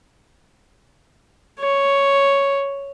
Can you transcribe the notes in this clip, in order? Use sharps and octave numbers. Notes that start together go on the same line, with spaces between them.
C#5